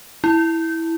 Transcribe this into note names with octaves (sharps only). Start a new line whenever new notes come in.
E4